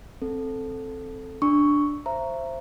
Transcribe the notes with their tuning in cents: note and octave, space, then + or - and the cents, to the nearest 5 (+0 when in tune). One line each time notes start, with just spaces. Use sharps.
C4 +10 A4 +0
D4 +0 C#6 +5
C5 +10 E5 +35 A#5 +0